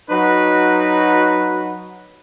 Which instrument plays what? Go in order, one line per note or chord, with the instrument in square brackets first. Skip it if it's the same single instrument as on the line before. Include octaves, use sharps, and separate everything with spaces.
[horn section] F#3 D#4 F#4 B4